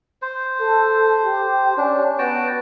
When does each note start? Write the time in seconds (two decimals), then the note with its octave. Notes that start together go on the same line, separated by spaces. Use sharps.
0.22 C5
0.60 A4
1.24 G4
1.77 C#4 D4
2.18 B3 F#4 G5 A5